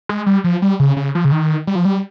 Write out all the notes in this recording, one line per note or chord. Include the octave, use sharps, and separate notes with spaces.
G#3
G3
F3
G3
C#3
C#3
F3
C#3
D#3
G3
F3
G3